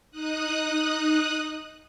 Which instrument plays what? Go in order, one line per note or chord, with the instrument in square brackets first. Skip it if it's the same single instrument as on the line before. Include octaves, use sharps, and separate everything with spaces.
[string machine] D#4 D#6 F#6